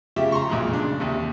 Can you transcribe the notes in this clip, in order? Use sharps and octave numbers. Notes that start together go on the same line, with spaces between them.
C#3 F3 G4 E5 F5
A#5 C6 C#6
B1 A#2 F3 G#3
C#3 D4
D#2 C3